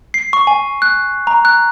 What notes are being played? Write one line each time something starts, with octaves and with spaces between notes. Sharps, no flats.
C7
C#6
G#5
F#6
A#5
F#6